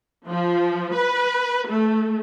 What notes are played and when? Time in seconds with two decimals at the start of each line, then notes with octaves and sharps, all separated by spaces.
0.25 F3
0.92 B4
1.66 A3